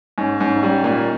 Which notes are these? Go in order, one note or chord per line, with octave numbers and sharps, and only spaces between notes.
G#2 C#4
G#2 C#4
D#4
G3 C#4
A#2 D#4